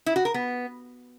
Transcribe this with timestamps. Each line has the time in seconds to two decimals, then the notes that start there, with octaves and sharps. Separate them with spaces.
0.06 E4
0.16 F#4
0.25 A#4
0.34 B3